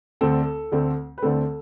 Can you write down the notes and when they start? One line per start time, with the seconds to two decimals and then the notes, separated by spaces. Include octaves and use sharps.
0.21 D2 D3 A3 C4 A4
0.72 D2 D3 A3 C4
1.18 B4
1.22 D2 D3 A3 C4 A4